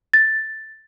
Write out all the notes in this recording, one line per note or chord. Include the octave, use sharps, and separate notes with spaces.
A6